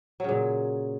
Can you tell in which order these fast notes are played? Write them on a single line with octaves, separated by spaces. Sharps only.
F#3 C#3 A#2